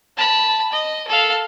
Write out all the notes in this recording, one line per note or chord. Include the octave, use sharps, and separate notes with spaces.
A5 B5
D#5
A4 F5